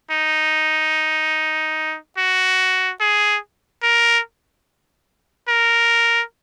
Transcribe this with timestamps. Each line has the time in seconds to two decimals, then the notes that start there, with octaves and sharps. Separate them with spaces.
0.11 D#4
2.17 F#4
3.00 G#4
3.83 A#4
5.48 A#4